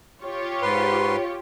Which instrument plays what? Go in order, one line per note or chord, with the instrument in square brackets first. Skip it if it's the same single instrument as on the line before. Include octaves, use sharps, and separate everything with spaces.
[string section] F4 G4 C#5
[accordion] G#2 B4 C6